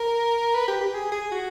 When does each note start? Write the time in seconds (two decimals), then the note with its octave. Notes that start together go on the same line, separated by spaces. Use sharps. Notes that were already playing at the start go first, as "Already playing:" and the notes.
Already playing: A#4
0.55 B4
0.68 G4
0.81 G4
0.94 G#4
1.12 G#4
1.31 F#4